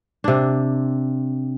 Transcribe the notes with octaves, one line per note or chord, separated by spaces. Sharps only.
C3 D4